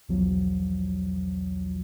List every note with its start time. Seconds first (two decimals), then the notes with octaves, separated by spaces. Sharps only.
0.09 B1 E2 F3 F#3